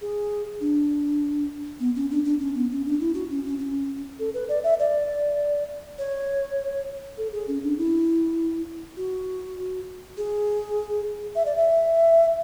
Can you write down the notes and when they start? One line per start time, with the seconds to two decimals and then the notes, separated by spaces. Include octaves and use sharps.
0.01 G#4
0.61 D4
1.80 B3
1.96 C#4
2.11 D4
2.25 D4
2.40 C#4
2.55 B3
2.71 C#4
2.86 D4
3.00 E4
3.14 F#4
3.30 C#4
3.44 C#4
3.59 C#4
4.19 A4
4.34 B4
4.49 D5
4.64 E5
4.79 D5
5.98 C#5
7.17 A4
7.32 G#4
7.48 C#4
7.63 D4
7.78 E4
8.97 F#4
10.17 G#4
11.36 E5
11.46 D5
11.56 E5